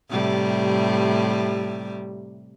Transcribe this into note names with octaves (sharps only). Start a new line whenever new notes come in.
A2 C3 G3